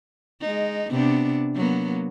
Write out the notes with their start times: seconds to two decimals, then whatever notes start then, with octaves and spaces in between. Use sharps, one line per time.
0.41 G#3 D#4
0.90 C3 B3 D4
1.55 F#3 A#3 B3